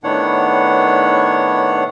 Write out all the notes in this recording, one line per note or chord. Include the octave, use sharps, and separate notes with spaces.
A2 D#3 B3 D4 C#5 F#5